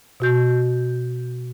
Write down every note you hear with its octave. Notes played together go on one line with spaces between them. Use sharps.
B2 F#4 G6